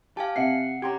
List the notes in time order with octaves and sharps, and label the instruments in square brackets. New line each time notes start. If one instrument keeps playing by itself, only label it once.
[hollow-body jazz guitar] G4 [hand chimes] F5 G#5 A5
[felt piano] C3 E5 F#5 [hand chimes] C7 C#7
[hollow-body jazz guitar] C#4 G4 [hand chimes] A#5 C6 G#6